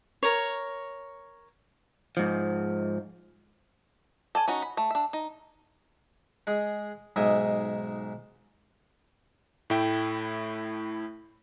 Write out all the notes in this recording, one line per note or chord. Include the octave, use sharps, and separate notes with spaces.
A#4 C#5
G#2 F3
A4 D5 G#5
C#4 D#4 F#4
B5
A3
D4 E5
D#4
G#3 G#4
B1 G#2 D#5 E5 G#5
A2 A3 E4 G5